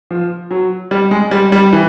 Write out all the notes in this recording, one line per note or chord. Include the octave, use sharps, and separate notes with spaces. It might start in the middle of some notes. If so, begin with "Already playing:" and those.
F3
F#3
G3
G#3
G3
G3
E3